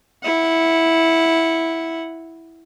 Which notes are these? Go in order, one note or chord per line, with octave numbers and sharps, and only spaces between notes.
E4 F#5